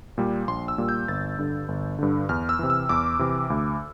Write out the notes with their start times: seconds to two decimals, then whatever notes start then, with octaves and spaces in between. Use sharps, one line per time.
0.18 A#2 G3
0.48 A#1 C6
0.68 E6
0.78 A#2 G3
0.89 G6
1.08 G1 A6
1.38 G2 D3
1.68 G1
1.99 G2 D3
2.29 E2 F6
2.49 E6
2.59 C3 E3
2.70 E6
2.89 E2 D6
3.19 C3 E3
3.50 D2